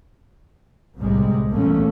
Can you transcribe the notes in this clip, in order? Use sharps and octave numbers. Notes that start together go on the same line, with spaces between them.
G1 C2 A2 C3 G3 G#3
G#1 E2 A#2 A3 A#3 C#4